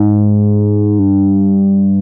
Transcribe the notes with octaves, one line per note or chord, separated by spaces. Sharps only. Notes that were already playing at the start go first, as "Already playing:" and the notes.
Already playing: G#2
G2